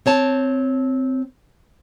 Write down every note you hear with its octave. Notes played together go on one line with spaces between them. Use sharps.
C4 C#5 A5